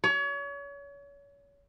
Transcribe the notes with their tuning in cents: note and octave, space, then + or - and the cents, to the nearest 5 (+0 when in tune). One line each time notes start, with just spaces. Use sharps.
C#5 +35